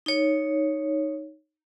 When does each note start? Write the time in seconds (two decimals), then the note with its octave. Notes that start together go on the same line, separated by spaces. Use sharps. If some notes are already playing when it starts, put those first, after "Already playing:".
0.06 D#4 C#5